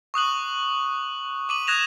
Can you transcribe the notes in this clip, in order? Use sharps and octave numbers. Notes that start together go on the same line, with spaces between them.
C#6 D#6 F#6 F#7
D6 D#7 F#7
D#6 F#6 G#6 A#6 E7 F7